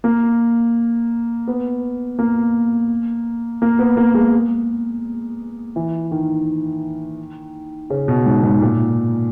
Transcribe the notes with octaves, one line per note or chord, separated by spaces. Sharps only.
A#3
B3
A#3
A#3
B3
A#3
G#3
E3
D#3
C#3
B2
G#2
G#2
A#2